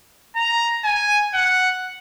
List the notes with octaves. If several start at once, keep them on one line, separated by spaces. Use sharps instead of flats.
A#5
G#5
F#5